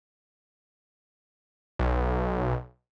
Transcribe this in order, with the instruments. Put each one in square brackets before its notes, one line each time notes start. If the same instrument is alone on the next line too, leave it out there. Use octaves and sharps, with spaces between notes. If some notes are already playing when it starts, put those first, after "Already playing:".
[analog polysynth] B1